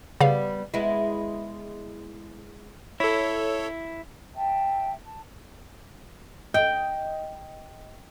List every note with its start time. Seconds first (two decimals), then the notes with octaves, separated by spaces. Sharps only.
0.21 C#3 G3 B3 F5
0.74 G#3 B3 E4
3.00 E4 A4 C#5
4.35 E5 G5 A5
5.02 A5
6.54 D#5 G5